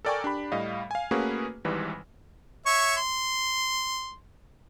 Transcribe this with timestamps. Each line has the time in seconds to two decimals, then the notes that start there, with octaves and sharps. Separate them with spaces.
0.05 A4 A#4 D5 G5 G#5 C#6
0.24 D4 G4 B5
0.52 A2 G3 D#5 F5
0.91 F5 G#5
1.11 A3 A#3 C#4 F#4 G#4 B4
1.65 G#1 G#2 E3 G3 B4
2.66 C#5 E5 C#6
2.97 C6